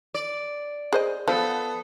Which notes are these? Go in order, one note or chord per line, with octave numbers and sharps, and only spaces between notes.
D5
G#4 C5 D#5
F3 B3 A4